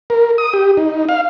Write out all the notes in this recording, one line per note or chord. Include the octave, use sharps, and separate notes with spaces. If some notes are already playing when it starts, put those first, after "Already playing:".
A#4
D#6
G4
D#4
F5